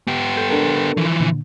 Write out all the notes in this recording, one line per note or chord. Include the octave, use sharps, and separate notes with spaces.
B3 G4
A4 G6
D4 A4 A#4
E3 F3
A#2 D3